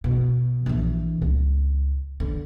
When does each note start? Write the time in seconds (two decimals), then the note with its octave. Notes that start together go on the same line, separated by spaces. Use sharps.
0.04 B2
0.66 A#1 E3
1.22 C#2
2.20 D3